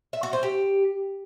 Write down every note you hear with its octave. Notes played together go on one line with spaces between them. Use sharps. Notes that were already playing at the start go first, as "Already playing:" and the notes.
E5
F#4
C5
G4